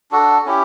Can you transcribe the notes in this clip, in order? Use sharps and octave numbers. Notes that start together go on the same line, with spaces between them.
D4 F#4 A4
C#4 E4 G4